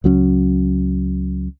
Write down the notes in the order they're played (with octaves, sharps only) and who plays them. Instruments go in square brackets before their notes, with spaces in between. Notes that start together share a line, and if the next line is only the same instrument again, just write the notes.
[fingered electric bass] C#2 F#3 C4 C#4